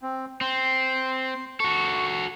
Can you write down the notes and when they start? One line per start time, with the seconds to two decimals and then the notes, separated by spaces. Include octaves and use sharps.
0.02 C4
0.41 C4 C6
1.60 F#4 A4 C#6